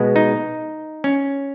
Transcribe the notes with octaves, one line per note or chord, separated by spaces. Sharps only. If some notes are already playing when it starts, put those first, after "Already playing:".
Already playing: B2 G#3 B3
D#4
C#4